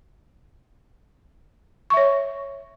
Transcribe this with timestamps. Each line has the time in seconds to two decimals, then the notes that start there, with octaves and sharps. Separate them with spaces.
1.90 C#6
1.94 E5
1.97 C#5